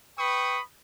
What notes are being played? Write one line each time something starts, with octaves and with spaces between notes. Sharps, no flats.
B4 G5 B5 C#6 D#6